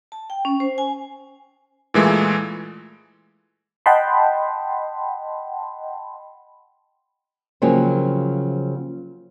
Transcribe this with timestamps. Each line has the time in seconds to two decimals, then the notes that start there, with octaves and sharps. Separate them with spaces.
0.12 A5
0.30 G5
0.45 C#4
0.60 C5
0.78 G#5
1.94 A#2 E3 G#3 A3
3.86 D#5 F#5 G5 A5 B5 C6
7.62 C#3 F3 F#3 A#3 C4